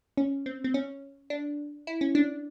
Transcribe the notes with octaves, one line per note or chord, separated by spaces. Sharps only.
C#4
C4
C4
C#4
D4
E4
C#4
D4